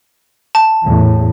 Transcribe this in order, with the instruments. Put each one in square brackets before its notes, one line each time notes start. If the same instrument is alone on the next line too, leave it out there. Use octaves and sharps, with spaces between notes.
[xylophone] A5
[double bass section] E2 A2